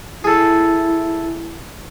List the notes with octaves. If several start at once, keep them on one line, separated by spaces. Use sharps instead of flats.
E4 G#4 A4